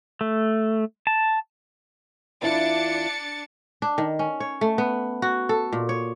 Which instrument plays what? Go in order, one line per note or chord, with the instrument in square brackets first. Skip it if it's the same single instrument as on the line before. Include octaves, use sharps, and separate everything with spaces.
[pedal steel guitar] A3
A5
[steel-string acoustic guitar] E2 E4 F4 [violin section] D4 A6 C#7
[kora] D4
D#3
C#4
C#5
A3
B3
F#4
A4
A#2
C#5